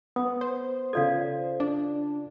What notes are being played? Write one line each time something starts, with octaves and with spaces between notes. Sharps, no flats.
B3 D#6
C5
C#3 F4 A4 D5 F5 G#6
D4